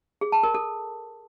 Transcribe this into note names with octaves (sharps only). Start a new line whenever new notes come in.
G#4
A5
A#4
A4